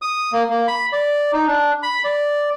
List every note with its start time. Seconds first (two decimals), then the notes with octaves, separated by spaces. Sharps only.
0.02 D#6
0.32 A#3
0.49 A#3
0.68 B5
0.92 D5
1.33 D#4
1.47 D4
1.83 B5
2.04 D5